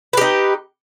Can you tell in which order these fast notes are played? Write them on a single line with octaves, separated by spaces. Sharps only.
B4 G4 D#4